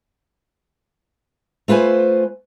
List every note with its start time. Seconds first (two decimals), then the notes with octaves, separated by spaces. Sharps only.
1.68 A3 F4 B4 C5 G#5